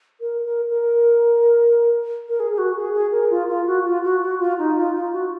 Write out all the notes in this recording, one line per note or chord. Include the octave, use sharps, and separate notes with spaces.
A#4
A#4
A#4
A#4
G#4
G#4
F#4
G#4
G#4
A#4
F4
F4
F#4
F4
F#4
F#4
F4
D#4
F4
F4
F#4